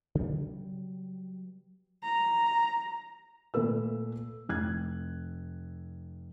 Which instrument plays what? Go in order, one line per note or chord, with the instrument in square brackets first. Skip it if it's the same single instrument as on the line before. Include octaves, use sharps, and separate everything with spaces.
[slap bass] C#3 F#3 G3 B3
[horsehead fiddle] A#5
[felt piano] A#2 A3 B4 E6
F1 F#6 G#6